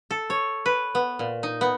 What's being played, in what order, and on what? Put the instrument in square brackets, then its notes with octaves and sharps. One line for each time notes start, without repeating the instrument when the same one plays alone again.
[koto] A4
C#5
B4
B3
A#2
D#4
B3